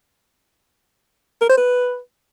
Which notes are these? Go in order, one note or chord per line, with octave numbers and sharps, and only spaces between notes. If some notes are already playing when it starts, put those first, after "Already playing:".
A#4
C5
B4